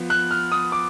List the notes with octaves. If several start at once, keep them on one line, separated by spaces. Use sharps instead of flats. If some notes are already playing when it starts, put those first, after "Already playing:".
Already playing: F3 B3
F#6
F6
D#6
D6